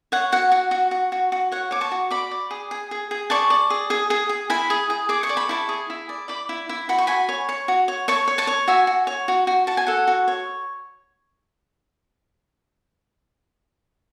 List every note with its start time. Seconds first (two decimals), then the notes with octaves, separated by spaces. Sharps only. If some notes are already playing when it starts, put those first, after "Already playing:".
0.12 C#5 F#5
0.32 F#4 F#5
0.52 F#4
0.71 F#4
0.91 F#4
1.12 F#4
1.32 F#4
1.52 C#5 F#5
1.71 C#5 D6
1.81 A5 C#6
1.91 F#4
2.10 D5 B5 D6
2.31 D5
2.51 G#4
2.71 G#4
2.91 G#4
3.11 G#4
3.30 D5 A5 C#6
3.50 D5
3.70 G#4
3.90 G#4
4.10 G#4
4.29 G#4
4.50 E4 G#5 B5
4.70 G#4
4.90 G#4
5.09 G#4 D6
5.23 C#6
5.29 D5
5.37 B5
5.49 E4 A5 C#6
5.69 G#4
5.90 E4
6.09 D5
6.28 D5 B5 D6
6.49 E4
6.69 E4
6.89 F#4 B5
6.98 C#6
7.07 F#4 G#5 B5
7.29 C#5
7.49 C#5
7.68 F#4
7.88 C#5
8.08 C#5 A5 C#6
8.28 C#5
8.38 A5 C#6
8.47 C#5
8.68 F#4 E5 G#5
8.87 F#4
9.07 C#5
9.28 F#4
9.47 F#4
9.67 F#4 A5
9.77 G#5
9.87 A4 F#5
10.07 F#4
10.28 C#5